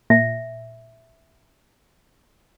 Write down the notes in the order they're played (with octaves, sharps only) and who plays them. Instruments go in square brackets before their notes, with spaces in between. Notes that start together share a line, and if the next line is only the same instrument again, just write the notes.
[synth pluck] A#2 [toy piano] E5